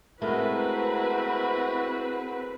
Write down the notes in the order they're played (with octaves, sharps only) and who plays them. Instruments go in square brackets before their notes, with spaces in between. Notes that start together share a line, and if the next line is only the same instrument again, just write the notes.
[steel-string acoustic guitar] G#3 A3 A#4 [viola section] C4 B4 [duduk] E4 [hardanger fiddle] F#4